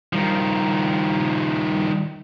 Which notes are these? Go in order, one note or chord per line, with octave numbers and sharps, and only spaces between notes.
D#3 F3 G3